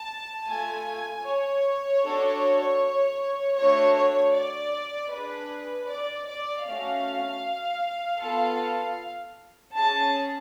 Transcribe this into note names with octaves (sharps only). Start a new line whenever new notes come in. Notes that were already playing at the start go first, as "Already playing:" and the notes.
Already playing: A5
A3 F4 A4 G#5
C#5
D4 F#4 A4
A3 D4 F#4 C#5
C#5
D5
D4 G#4 B4
D5
D5
A3 C#4 F#4 F5
B3 F4 A4
C#4 G#4 A5